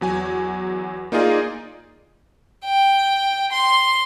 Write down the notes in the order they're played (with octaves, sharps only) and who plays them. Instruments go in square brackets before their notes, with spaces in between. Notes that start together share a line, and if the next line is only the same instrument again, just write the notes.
[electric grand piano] E2 F#3 G#5
A#3 D#4 F4 G#4 A#4 D5
[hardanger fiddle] G5
C6